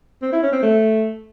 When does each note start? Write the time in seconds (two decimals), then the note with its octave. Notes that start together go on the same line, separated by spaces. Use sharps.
0.22 C4
0.32 E4
0.42 C#4
0.52 C4
0.62 A3